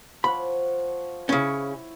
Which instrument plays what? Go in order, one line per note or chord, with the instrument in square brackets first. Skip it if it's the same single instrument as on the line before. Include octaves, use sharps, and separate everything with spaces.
[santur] F3 C#5 F#5 [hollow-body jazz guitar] B5
[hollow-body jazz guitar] C#3 C#4 [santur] E4